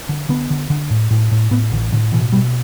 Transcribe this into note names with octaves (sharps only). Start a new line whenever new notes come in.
D3
D3 B3
D3
D3
A2
A2
A2
A2 B3
A1 D3
A2 D3
B2 E3
B2 G3